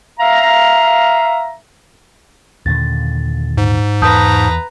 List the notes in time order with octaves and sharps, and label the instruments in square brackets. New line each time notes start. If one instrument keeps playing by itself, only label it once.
[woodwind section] E5 F5 A#5
[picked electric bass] D#2 A#2 D3 [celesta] A6
[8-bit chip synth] G#2
[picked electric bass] E2 [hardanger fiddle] B4 A#5 [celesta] A5 D#6 G6